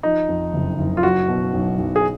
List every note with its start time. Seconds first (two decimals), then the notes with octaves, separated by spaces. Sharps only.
0.03 F3 D#4
0.29 F2
0.54 F#1
0.79 F#1
0.97 F4
1.03 F#3 F#4
1.28 B2
1.54 B1
1.78 B1
1.96 G#4